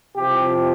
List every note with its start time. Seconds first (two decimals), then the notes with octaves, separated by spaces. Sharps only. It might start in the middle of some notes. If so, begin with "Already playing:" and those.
0.16 C2 C3 F3 G4